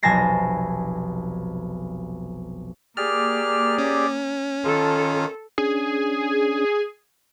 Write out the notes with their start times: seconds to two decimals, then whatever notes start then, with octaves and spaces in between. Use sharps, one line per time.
0.03 F1 B1 G#5 A5 A#6 C7
2.97 A#3 G4 G#4 D5 F6
3.78 C#4
4.64 D#3 F4 A4
5.58 C#4 D4 G#4